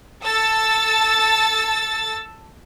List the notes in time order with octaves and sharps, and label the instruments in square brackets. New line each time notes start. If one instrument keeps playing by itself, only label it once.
[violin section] A4 A5 E6 A6